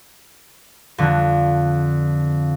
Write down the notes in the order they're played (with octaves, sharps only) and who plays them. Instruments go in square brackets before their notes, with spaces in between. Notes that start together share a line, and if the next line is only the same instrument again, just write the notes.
[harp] F2 D3